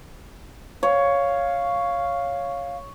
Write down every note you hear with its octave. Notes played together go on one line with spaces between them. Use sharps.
C#5 F5